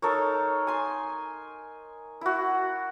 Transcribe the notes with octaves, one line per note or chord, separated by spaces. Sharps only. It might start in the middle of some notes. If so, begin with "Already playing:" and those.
D#4 A4 A#4 C#5
G#5 C6
E4 F#4